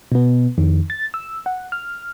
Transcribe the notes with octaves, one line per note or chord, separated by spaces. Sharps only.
B2 B3
F2 D#3
A6
E6
F#5
F6